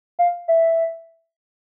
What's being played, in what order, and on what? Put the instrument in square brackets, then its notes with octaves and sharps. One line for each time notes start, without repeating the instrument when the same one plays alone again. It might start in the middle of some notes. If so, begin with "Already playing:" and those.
[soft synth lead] F5
E5